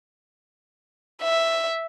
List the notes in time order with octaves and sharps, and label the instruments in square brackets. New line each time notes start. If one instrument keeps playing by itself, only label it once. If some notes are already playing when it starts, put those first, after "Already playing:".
[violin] E5